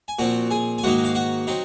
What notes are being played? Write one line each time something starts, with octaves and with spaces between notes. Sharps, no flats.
G#5
A#2 F3 C4 F#4 F#5
G#4 G#5
G#5
G#2 D#3 A#3 D#4 F#4 F#5
F5
F#4 F#5
F#3 C4 D#4